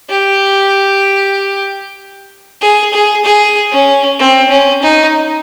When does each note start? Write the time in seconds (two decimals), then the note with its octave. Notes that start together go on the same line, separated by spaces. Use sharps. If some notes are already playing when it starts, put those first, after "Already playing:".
0.10 G4
2.61 G#4
2.93 G#4
3.24 G#4
3.72 C#4
4.19 C4
4.50 C#4
4.82 D#4